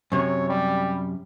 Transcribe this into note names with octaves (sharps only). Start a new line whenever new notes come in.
F#2 C3 C#5
G3